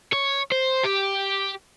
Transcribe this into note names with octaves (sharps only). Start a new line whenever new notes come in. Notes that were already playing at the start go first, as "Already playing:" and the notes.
C#5
C5
G4